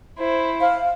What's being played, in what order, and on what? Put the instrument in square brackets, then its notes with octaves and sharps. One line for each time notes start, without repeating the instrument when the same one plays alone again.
[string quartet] E4 C5
[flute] F5